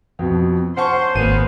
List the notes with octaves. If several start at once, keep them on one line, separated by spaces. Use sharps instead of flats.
F2 B2
C#4 C5 F#5 A5 C6 C#6
G#1 A#3 B3 D#7